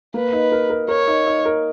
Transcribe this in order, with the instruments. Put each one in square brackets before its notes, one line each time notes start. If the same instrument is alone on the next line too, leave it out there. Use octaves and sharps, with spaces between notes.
[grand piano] A#3 [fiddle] B4
[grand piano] D#4
A#4
A#4
[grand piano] A#4 [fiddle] C#5
[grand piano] D#4
D#4
A#4